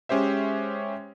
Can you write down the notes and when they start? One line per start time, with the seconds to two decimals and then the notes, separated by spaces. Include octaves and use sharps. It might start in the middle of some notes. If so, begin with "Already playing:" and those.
0.09 G#3 C#4 G4 C5 E5